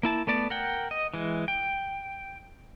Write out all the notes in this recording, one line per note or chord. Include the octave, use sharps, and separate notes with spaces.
A#3 E4 A5
A3 B3 D5 A5
A#4 F#5 G5
D#5
E3 G#3
G5